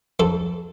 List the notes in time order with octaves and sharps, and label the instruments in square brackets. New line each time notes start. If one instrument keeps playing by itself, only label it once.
[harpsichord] F2 A4